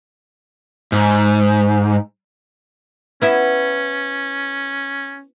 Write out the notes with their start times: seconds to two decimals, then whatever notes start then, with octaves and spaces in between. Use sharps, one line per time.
0.92 G#2
3.22 B3 C#4 E4 E5